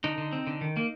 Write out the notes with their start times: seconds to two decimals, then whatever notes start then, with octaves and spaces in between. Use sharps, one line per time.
0.04 D3 D#4
0.18 D3
0.33 C4
0.47 D3
0.61 D#3
0.77 A#3